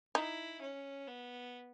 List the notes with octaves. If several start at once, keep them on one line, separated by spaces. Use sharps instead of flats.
D#4 E4
C#4
B3